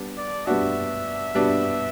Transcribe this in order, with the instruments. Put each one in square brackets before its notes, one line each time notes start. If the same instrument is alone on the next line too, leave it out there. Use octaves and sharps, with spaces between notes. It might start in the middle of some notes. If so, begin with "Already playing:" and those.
Already playing: [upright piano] G3 B3 D4
[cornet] D5
[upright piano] G3 B3 D4 F#4 [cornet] E5
[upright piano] G3 B3 D4 F#4